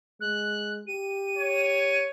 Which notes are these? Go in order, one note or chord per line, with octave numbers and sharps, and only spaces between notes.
G#3 F#6
G4 D#7
C#5